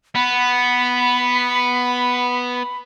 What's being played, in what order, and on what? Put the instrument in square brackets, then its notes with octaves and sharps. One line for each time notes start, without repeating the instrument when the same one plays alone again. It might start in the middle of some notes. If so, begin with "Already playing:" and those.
[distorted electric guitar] B3 [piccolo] B5